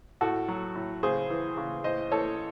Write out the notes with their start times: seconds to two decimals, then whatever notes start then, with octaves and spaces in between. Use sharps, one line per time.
0.21 A2 F#4 A4
0.48 F#3
0.75 A2
1.03 C#3 G#4 C5
1.30 E3
1.57 C#3
1.84 A2 C5 D#5
2.12 E3 A4 C#5